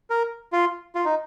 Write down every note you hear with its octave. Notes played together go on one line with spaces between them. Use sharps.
A#4
F4
F4
D#4